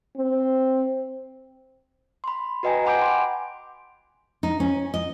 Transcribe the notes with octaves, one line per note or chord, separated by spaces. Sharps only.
C4
B5 C6
F#4 B4 D#5 G5 G#5 A#5
F#5 G#5 B5 D6 G6 D7
C6
D#4
C#4
D#5